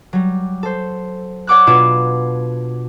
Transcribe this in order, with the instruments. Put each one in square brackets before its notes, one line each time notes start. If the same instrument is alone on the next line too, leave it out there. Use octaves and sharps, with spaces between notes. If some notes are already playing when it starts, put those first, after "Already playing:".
[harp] F#3 G3
A4 C5
C#5 D5 F#5 D6 E6 F#6
B2 D4 F4 D5 G#6 E7